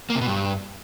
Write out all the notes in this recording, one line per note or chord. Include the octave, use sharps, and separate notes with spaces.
A#3
C3
B2
G2